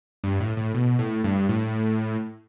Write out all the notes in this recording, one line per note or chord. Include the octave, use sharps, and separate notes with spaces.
G2
A2
A2
B2
A2
G2
A2